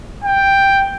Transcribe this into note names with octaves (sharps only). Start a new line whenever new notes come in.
G5